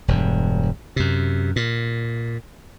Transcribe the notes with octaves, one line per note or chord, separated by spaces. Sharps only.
E1 G2
F#2 C3
A#2